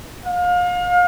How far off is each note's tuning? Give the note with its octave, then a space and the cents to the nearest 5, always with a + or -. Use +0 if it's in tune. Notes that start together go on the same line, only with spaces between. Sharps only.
F5 +35